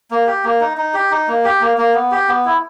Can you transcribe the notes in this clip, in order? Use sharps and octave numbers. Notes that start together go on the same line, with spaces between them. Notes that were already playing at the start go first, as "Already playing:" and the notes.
A#3
G4
A#3
D#4
D#4
G4
D#4
A#3
G4
A#3
A#3
B3
G4
B3
E4